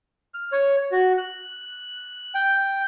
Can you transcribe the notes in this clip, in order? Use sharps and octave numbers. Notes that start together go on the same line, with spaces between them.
F6
C#5
F#4
F#6
G5